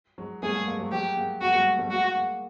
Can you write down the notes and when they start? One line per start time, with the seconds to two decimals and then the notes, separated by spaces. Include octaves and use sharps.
0.18 F#3 G#3
0.42 G3 A3 G#4
0.55 G#3 A#3
0.67 G#3 A#3
0.80 F#3 G#3
0.92 F#3 G#3 G4
1.17 G#3 A#3
1.41 G#3 A#3 F#4
1.54 G3 A3
1.79 G3 A3
1.91 G#3 A#3 F#4
2.16 G#3 A#3